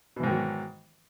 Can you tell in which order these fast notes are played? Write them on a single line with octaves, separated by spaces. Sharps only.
B2 E3 G#2 D#3 F#3